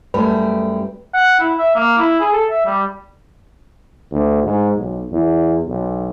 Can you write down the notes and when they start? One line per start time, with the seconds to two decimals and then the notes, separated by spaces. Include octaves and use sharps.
0.14 F#2 G3 A3 B4
1.14 F#5
1.40 E4
1.58 E5
1.75 A#3
1.98 E4
2.20 G#4
2.32 A4
2.50 E5
2.66 G3
4.11 D2
4.43 G#2
4.76 B1
5.12 E2
5.67 B1